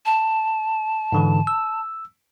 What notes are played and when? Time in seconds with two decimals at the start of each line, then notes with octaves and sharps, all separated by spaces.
0.05 A5
1.12 G#2 D3 E3
1.47 E6